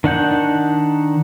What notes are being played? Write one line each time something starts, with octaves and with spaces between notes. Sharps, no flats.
D#3 D4 F#5 G6